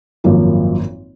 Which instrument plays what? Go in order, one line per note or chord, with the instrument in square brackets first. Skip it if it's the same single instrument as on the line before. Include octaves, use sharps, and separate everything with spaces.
[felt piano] G#1 F#2 F3 A#3 F4